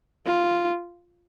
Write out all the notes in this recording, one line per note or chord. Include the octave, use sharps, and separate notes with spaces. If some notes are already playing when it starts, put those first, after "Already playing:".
F4